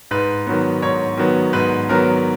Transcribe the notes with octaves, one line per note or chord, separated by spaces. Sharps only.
G#2 B4
D#3 F#3 B3
G#2 C#5
D#3 F#3 B3
G#2 B4
D#3 F#3 B3 A#4